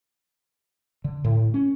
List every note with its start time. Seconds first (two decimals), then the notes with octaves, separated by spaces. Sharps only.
1.04 D3
1.24 A2
1.54 C#4